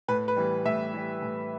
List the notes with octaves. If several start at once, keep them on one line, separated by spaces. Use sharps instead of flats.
A2 B4
B4
E3 G3
A2 E5
E3 G3
A2